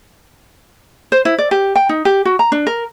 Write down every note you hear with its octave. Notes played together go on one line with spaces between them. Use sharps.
C5
E4
D5
G4
G5
D#4
G4
F#4
A#5
D4
A#4